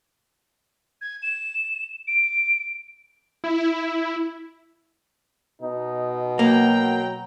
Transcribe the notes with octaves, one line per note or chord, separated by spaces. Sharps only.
G#6
E7
D7
E4
B2 D#4
F#3 A#3 G5 A#5